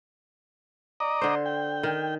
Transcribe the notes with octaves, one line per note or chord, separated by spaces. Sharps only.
D5 D#5 A#5
D3 C5
G5
D#3